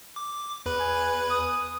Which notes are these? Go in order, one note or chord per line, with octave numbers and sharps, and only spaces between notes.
D6
E2 B4 B5
G#5
D#6